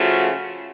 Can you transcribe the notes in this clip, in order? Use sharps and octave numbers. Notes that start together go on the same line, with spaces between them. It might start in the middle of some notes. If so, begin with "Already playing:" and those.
Already playing: C#3 F3 A3 F#4